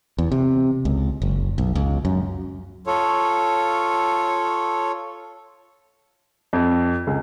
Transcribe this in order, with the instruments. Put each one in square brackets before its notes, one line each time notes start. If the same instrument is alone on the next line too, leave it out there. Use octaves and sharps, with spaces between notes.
[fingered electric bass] E2
C3
C#2
F#1
B1
C#2
F#2
[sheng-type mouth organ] F4 A4 C#5
[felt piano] F2
C#2